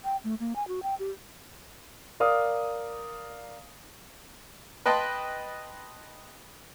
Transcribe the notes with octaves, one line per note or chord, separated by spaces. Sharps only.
G5
A3
A#3
G#5
F#4
G5
G4
A#4 D5 F5 D#6
B4 D#5 G5 A5 C6